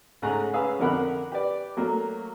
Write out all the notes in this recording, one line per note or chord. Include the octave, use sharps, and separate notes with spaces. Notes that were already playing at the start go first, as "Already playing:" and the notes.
G#2 C#3 A3 G#5 A#5 F#6
C#4 G#4 B4 F5 D#6 E6
F2 D3 A#4 F#5 B5 F#6
G4 B4 D5
F#3 A3 A#3